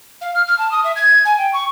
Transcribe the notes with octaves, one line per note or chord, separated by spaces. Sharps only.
F5
F6
F6
A5
D#6
E5
G#6
G#5
G5
C#6